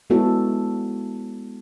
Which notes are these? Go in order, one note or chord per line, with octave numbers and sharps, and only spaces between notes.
G#3 B3 E4 F#4 A4 C#5